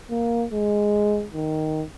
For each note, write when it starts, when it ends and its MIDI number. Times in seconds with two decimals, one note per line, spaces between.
0.10 0.45 58
0.52 1.25 56
1.34 1.83 51